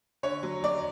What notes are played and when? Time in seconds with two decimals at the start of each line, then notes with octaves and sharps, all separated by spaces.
0.23 D3 C#5
0.43 F#3
0.64 F#3 D5